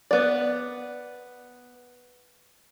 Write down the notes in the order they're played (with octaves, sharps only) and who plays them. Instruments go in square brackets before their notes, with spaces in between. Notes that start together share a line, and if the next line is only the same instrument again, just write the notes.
[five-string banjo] B3 D5